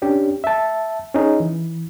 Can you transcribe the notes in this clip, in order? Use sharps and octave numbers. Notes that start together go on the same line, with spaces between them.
C#4 D4 G4
E5 A5
C#4 D#4 G#4
E3